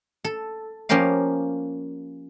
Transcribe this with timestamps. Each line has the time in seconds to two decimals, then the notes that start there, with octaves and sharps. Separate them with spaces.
0.24 A4
0.89 F3 A#3 C#4 G4 A#4 F5